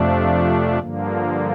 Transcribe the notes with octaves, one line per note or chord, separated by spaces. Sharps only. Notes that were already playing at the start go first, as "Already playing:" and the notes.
Already playing: F2 C3 F3 A3 D4
G2 D3 F3 A#3